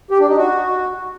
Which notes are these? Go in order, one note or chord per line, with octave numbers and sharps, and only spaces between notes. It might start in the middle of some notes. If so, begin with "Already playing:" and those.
G4
D4
D#4
F#4